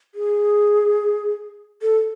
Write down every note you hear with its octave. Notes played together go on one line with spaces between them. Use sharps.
G#4
A4